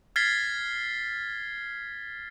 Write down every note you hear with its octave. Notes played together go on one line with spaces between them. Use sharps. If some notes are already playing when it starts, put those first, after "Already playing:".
F6 G#6 A6 B6 C7 G7